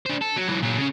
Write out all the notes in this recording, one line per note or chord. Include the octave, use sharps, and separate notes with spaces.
D4 C5
A4
F#3
E3 F#3
A#2 F#3
C#3 C#4